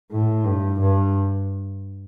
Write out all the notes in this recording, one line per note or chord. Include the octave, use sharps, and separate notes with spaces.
A2
G2
G2